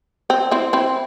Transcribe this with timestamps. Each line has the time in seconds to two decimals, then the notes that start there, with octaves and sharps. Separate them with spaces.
0.30 C4
0.51 C4 E4
0.73 C4 E4